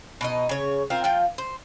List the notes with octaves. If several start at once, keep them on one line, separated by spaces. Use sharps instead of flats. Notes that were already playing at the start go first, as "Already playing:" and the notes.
B2 D#4 D#5
C#3 C#5
C4 F4 A#4
F3 F4 G5
C5